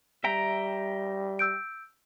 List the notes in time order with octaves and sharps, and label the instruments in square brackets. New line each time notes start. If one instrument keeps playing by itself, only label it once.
[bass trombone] G3 [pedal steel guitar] E5 G5 A#5
[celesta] E6 G6 D7